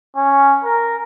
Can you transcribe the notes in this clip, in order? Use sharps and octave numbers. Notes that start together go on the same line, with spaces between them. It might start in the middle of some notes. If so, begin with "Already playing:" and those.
C#4
A#4